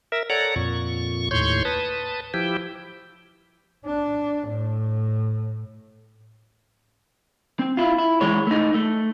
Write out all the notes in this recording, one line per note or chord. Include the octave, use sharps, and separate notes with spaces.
A#4 E5
A4 C#5 D5 F#5 A#5
F2 A#2 C#6
D#2 A2 C#5 C6 C#6 G6
B4 A5 D#6
F3 E4 G4 G5
D4
A2
C4
E4 F4
E4
E3 G#3 C#5
A3 D#4
A3